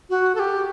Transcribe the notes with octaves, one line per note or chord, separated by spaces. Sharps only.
F#4
A4
G4